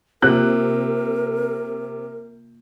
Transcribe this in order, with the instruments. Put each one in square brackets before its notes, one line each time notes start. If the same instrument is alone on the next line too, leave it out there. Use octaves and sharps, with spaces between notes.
[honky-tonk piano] C3 [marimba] A#3 F4 [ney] A#4 [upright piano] F#6